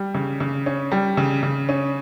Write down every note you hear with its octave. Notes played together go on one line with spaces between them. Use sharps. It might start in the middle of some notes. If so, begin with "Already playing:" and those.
Already playing: G3
C#3
C#3
C#4
G3
C#3
C#3
C#4